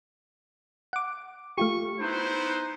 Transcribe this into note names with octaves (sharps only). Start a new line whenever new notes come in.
F#5 D6
A3 F4 G4 C#6
B3 D#4 E4 C5